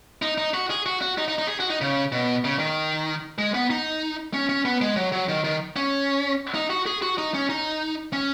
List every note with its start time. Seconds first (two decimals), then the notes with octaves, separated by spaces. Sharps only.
0.22 D#4
0.38 D#4
0.54 F#4
0.70 G#4
0.86 F#4
1.01 F#4
1.18 D#4
1.28 D#4
1.38 D#4
1.48 G#4
1.60 F#4
1.70 D#4
1.81 C#3
2.12 B2
2.44 C#3
2.59 D#3
3.38 G#3
3.55 B3
3.70 D#4
4.34 C#4
4.49 C#4
4.65 B3
4.81 G#3
4.96 F#3
5.12 F#3
5.29 D#3
5.44 D#3
5.76 C#4
6.54 D#4
6.70 F#4
6.86 G#4
7.02 F#4
7.18 D#4
7.34 C#4
7.49 D#4
8.13 C#4